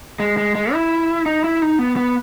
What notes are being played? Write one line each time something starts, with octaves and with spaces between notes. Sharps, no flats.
G#3
G#3
G#3
E4
D#4
E4
D#4
B3
B3